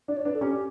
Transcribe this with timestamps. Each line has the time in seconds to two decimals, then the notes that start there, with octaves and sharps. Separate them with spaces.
0.08 D4 D5
0.17 C#5
0.25 D4 B4
0.34 A4
0.41 C#4 G4